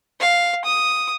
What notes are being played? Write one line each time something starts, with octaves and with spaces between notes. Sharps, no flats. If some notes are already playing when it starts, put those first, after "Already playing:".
F5
D#6